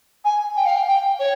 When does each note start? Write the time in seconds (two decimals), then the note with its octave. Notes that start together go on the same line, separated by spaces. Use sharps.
0.24 G#5
0.56 G5
0.65 F5
0.76 G5
0.88 G5
1.19 C#5